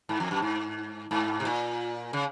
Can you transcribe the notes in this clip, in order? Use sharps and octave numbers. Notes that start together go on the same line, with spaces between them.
G#2
F2
F#2
G#2
G#2
C3
A#2
C#3